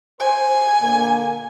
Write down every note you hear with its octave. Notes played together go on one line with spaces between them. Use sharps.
C5 G#5
A#2 D3 A#3